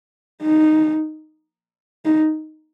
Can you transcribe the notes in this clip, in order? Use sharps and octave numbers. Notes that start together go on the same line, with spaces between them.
D#4
D#4